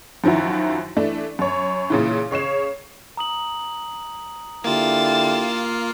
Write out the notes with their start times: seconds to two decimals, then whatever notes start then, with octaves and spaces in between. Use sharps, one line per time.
0.24 F#2 D#3 F3 E4 F#4
0.97 E3 A3 D4
1.39 F#2 C#5
1.90 A#2 C#3 E3
2.31 C#3 C#5 C7 E7
3.17 A#5 D#6 F#7
4.64 D3 A#3 E4 F4 G4 A6 E7